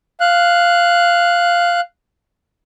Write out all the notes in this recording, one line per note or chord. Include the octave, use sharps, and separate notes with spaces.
F5 F#6